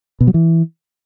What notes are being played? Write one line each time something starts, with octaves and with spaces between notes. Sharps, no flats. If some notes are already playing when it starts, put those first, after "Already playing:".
B2
F#3
E3